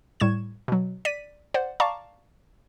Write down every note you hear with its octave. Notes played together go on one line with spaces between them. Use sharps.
A2 G3 C#6 G#6 E7
B2 F#3
D5 B6 D#7
C5 D5 F#5
D5 F5 A5 A#5 C#6 D6